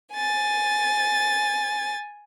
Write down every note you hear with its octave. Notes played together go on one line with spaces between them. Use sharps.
G#5 A6